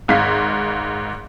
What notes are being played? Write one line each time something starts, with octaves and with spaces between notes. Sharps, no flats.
G#1 G#2 F5 B6